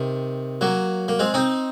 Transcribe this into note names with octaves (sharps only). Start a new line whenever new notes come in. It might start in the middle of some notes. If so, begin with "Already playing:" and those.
Already playing: C3 D#3
F#3 A#3
A#3
G#3 C4
C4 D#4